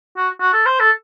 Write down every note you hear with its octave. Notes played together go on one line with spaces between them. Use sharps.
F#4
F#4
A4
C5
A4